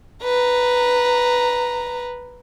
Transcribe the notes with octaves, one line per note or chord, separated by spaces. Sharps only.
B4 A#5